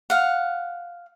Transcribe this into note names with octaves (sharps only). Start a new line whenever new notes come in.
F5 F#5